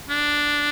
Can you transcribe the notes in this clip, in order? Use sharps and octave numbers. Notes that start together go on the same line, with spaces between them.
D4